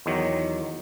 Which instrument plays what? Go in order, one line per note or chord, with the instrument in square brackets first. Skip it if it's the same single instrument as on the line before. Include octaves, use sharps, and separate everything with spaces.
[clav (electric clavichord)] E2 D#3 F#3